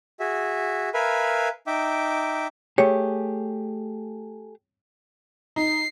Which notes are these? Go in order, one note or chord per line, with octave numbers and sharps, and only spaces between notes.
F#4 G#4 E5
A#4 B4 E5 F5 G#5 B5
D#4 E5 G5 D6
A3 G4 G#4 C#5
D#4 C7